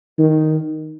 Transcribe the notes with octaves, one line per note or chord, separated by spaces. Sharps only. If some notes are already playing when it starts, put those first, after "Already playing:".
D#3